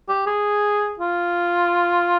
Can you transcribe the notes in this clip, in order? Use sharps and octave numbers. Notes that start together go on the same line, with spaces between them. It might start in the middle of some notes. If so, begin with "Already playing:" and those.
G4
G#4
F4